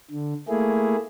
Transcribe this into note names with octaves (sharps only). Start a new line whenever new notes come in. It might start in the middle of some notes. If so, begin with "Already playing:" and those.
D3
A3 A#3 E4 G#4